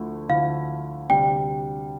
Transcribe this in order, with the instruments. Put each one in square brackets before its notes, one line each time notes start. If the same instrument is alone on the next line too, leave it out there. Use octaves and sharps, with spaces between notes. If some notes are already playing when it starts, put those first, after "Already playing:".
Already playing: [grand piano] D2 D3 F3 A3 E4
[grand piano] D2 D3 F3 A3 E4 [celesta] F5
[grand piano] D2 C3 G3 D4 [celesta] G5